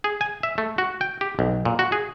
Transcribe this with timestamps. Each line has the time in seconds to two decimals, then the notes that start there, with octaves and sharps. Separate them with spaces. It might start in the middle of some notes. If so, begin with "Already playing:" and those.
0.04 G#4
0.21 G#5
0.43 E5
0.58 A3
0.78 F#4
1.01 G5
1.21 G4
1.39 B1
1.65 A#2
1.79 F#4
1.92 G#4